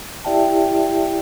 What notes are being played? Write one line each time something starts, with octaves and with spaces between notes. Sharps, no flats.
E4 G4 D5 E5 G5 A5